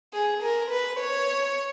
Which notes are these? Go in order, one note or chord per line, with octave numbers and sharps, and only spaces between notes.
G#4
A#4
B4
C#5